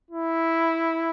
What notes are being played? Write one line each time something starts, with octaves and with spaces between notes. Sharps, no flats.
E4